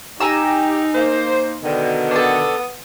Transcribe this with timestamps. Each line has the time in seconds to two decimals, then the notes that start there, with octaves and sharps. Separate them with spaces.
0.20 D#4 G4 G#5 A#5 E6
0.95 A#3 C5
1.63 B2 D3 D#3
2.11 B3 D4 A4 D#6